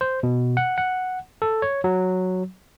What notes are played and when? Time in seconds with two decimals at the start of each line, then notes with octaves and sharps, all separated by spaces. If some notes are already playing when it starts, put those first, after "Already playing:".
0.01 C5
0.23 B2
0.57 F#5
0.78 F#5
1.42 A4
1.62 C#5
1.84 F#3